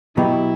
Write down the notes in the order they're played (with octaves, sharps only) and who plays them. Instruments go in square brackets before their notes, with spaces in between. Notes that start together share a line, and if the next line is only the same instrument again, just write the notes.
[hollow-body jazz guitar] B2 F#3 B3 D#4 G4 [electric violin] E4